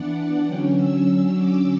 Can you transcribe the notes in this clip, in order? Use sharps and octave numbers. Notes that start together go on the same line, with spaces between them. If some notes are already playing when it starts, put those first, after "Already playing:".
Already playing: E3 B3 D4 D5 F#5
D3 F#3 C#4 G5
E6
D6